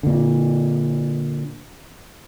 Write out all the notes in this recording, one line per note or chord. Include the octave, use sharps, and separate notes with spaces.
A#2 D3